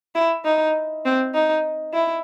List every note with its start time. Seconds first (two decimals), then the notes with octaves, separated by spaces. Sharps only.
0.15 E4
0.44 D#4
1.05 C4
1.34 D#4
1.93 E4